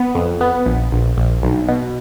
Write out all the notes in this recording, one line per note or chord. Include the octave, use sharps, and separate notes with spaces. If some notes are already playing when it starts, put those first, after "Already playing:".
Already playing: B3
F2
B3
A#1
A#1
A#1
B1
B2